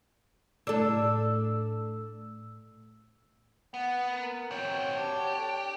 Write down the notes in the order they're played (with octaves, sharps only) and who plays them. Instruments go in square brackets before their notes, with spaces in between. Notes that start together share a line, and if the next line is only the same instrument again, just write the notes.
[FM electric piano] A2 E6 [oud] D4 A4
[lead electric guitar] B3 [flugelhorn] F#5
[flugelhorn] A#4
[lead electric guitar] C4 F#4 [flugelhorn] C#5 [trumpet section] G5
[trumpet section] D4 A5 [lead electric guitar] G4
[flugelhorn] A4